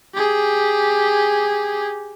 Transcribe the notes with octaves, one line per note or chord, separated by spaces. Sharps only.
G4 G#4